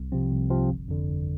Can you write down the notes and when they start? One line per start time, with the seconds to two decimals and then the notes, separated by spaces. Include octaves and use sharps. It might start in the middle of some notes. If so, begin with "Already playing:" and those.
Already playing: C2
0.12 C3 F3 C4
0.31 C2
0.50 C3 F3 C4
0.68 G1
0.88 F2 D3
1.07 G1